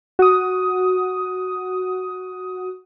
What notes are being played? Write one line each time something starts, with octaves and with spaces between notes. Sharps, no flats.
F#4 D#6